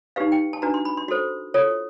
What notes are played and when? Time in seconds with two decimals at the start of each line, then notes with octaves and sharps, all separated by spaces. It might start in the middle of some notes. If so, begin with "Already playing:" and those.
0.16 D#4 G4 B4 F5
0.32 G5
0.53 A5
0.62 D4 F#4 B4 A#5
0.74 C6
0.85 B5
0.97 C6
1.08 F#4 A4 C5 C6
1.54 F4 A4 C#5